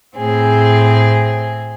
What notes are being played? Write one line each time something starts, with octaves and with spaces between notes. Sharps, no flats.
A2 C4 G#4